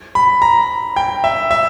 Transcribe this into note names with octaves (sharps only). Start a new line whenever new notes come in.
B5
A#5
G5
E5
E5